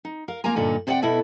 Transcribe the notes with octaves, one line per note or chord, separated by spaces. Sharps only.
D#4
A#4 F5
A#3 F4 A#4 G#5 A#5
G2 A#2 D3 D#4 A4
C3 C5 D5 D#5 F#5 G5
B2 B3 E4 A4 E5